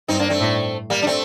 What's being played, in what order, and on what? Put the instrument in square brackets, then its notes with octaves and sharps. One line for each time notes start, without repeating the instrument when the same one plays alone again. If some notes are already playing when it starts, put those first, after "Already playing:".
[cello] G2 [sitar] C4 D#4
[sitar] A#3 D4
A3 C4
[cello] A2
[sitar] G3 A#3
D4
A3 C4